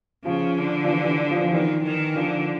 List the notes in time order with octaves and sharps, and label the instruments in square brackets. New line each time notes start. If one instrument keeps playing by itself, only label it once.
[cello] C#3 [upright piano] F3
[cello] D3
[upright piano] F3
E3
E3
F3
F3
[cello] D#3 [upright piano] E3
[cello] D#3
[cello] D3 [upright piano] F3